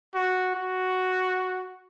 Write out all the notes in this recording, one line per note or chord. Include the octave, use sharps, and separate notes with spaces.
F#4
F#4